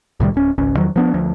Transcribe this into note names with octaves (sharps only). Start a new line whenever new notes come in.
C2 A2 D#3 G3
D1 C#4
G#1 C#2 C#4
E2 D#3 F3 F#3
F3 B3 D4
D2 F3